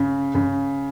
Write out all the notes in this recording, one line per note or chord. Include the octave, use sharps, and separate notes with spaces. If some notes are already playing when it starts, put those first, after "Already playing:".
Already playing: C#3
C#3